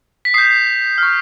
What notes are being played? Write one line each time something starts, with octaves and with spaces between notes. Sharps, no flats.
B6
D#6 G6 C7
C#6 F6